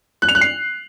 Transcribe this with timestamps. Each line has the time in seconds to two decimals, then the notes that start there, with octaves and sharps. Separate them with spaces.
0.22 F#6
0.29 F7
0.35 F#6
0.41 C7